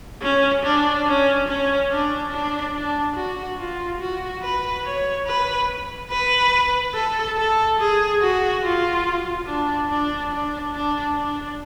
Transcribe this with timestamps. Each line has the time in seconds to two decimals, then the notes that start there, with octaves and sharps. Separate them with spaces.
0.22 C#4
0.63 D4
1.07 C#4
1.48 C#4
1.91 D4
2.32 D4
2.75 D4
3.16 F#4
3.59 F4
4.00 F#4
4.42 B4
4.84 C#5
5.27 B4
6.10 B4
6.94 A4
7.37 A4
7.79 G#4
8.20 F#4
8.63 F4
9.46 D4
9.88 D4
10.30 D4
10.72 D4
11.15 D4